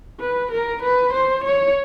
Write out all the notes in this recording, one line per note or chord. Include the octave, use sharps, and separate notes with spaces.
B4
A#4
B4
C5
C#5